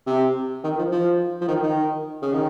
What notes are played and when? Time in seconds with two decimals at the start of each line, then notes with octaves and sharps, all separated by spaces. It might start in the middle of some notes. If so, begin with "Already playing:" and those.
0.07 C3
0.64 D#3
0.78 F3
0.92 F3
1.41 F3
1.48 D#3
1.63 D#3
2.22 C#3
2.33 D#3